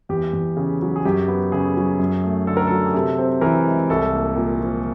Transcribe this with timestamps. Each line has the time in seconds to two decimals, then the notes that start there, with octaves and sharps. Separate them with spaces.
0.09 E2 G4
0.33 E2
0.57 C#3
0.82 F#3
0.96 G#4
1.05 F#2 G4
1.28 B3
1.52 C#3 G#4
1.76 F#3
1.99 F#2
2.24 A3
2.47 D3 A4
2.57 A#4
2.67 F#3 A4
2.86 G#4
2.94 C3 A4
3.18 C4
3.41 E3 A#4
3.66 G#3
3.90 C2 A4
4.13 A#3
4.36 A#2
4.61 F3